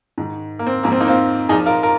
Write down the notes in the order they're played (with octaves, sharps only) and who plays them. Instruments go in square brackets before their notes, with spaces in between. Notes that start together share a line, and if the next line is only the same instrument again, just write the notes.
[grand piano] G#2 D#3
A#3
C4
G#2 F3 A#3
C4
A#3 D#4
C4 F4
A#2 F3 D#4 G#4
F4 A#4
F4 A#4